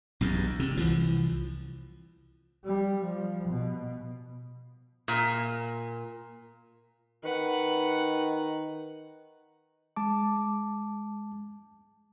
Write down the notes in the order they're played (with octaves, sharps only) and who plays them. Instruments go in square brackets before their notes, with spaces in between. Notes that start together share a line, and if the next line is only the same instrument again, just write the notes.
[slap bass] B1 E2 G2
C3
C2 E3 F3
[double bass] G3
F3
B2
[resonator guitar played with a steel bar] A#2
[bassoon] D#3 [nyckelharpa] B4 F#5
[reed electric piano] G#3 A5 D6